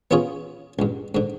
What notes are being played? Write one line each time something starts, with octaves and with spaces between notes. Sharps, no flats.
B3 C#4 F4 G#4 C#5
C#2 G2
G#2 D3